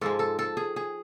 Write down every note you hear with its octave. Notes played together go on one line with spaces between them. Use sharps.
G#2 F3 G#3 A4
A4
A4
G#4
G#4